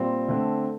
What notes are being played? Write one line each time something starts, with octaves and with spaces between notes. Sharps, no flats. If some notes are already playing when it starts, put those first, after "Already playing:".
Already playing: A#2 G3 C4
D3 A3 C4